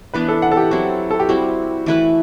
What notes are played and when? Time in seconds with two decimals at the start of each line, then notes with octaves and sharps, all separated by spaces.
0.14 E3 B3 D4 B4
0.28 A4
0.42 F#5
0.52 A4
0.57 G4
0.71 F#3 C4 E4 F#4
1.11 A4
1.20 G4
1.29 G3 C4 E4 F#4
1.86 E3 A3 E4 B4